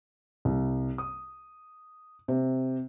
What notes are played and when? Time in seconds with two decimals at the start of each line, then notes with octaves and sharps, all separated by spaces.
0.45 C2
0.98 D#6
2.28 C3